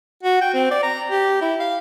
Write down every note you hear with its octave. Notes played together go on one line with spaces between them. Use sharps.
F#4
G5
C4
D5
A#5
G4
E4
F5